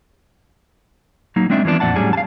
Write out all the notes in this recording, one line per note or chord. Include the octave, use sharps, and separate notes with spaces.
F#3 A#3 D#4
G#3 C4 D4 D5 E5
E3 F3 B3 D4
F2 A#2 D5 F#5 A5
A2 F#3 G3 C#4 G#4
F5 A5